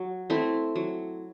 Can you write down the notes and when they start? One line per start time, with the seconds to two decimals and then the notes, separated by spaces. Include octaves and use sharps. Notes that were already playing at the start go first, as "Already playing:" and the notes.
Already playing: F#3
0.30 A3 C4 E4
0.76 F#3